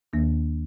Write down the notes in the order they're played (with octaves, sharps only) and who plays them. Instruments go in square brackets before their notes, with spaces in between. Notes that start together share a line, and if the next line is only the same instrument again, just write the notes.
[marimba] D#2 D#3 A#3